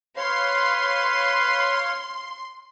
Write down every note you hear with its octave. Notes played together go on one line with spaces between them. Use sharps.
B4 C#5 F5 C6